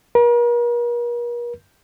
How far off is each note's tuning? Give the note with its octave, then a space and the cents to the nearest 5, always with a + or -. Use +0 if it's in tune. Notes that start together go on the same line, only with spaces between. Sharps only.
A#4 +45